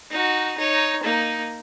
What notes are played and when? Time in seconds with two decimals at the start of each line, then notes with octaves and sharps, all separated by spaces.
0.11 D#4 F#4
0.58 D#4 C#5
1.03 A#3 D#4